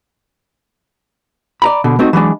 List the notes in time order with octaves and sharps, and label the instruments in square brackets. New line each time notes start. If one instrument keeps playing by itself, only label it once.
[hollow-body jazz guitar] D5 A#5 B5
B2 D3
A3 C4 D#4 F#4
E3 F#3 G#3 D4